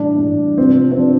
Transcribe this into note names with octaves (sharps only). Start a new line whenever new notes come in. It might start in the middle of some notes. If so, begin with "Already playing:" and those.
Already playing: A2 E3 G3 D4
A2 E3 G3
C3 F3 C4
C4
C3 F3 D4